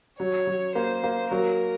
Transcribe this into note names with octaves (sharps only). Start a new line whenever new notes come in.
F#3 C#5
F#3
A#3 C5
A#3
F#3 A#4